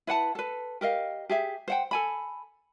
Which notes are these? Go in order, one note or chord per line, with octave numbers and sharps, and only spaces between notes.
E4 B4 F#5 A5
A4 B4
G4 A#4 D#5 F5
G4 G#4 E5
C5 F#5 G5
A4 G#5 B5